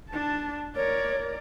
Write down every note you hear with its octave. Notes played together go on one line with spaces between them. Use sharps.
D4 A5
A#4 C#5 D5